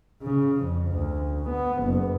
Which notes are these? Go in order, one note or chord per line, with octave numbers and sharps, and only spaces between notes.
C#3
F2
D2
B3
F#1